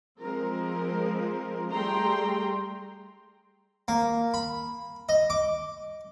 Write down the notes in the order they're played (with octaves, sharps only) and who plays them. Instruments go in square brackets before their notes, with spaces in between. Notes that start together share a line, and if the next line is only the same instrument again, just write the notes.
[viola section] F3 G#3 C4 A#4
G3 A3 G#4 G5 A#5 C6
[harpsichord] A#3
B5
D#5
D6